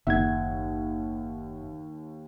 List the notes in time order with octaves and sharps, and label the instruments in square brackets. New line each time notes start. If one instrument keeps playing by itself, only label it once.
[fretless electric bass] F#1 [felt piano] D#2 [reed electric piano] E5 F#5 G#6